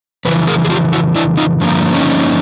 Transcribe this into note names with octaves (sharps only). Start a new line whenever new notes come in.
F2 C#3 E3 B4
G#4 A#4
G#4
F4 G4
E4 F#4
D4 E4
D#4 F4
G2 D3 F3 A#3
C#4 D#4